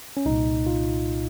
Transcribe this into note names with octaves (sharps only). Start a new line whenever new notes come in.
C#4
C2 A#2 D#4
F4